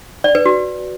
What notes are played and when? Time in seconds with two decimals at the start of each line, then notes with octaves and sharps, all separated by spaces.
0.24 D5
0.35 B4
0.46 F#4